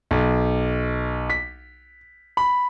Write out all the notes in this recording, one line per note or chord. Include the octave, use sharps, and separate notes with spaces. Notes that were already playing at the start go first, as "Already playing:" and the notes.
B1
B6
B5